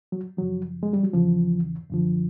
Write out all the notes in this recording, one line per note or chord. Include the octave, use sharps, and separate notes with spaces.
F#3
F#2 C#3 F3 F#3
G#3
G3
F#3
E2 C#3 E3 F3
F#2 D3 F3